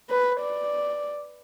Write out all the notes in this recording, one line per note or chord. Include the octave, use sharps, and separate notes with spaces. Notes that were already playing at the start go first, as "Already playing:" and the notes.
B4
D5